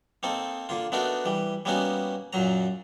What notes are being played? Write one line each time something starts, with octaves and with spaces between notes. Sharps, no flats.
A#3 C4 D#4 A4
D3 A#3 F4
A3 B3 D4 D#4 F#4 A#4
E3 G3
G3 A#3 B3 C#4 D#4 F#4
F#2 A#2 F#3 A#5